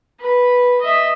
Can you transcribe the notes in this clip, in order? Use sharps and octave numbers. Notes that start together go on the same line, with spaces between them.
B4
D#5 E5